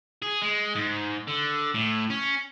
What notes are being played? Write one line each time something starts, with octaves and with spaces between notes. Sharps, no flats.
G#4
G#3
G#2
D3
A2
C#4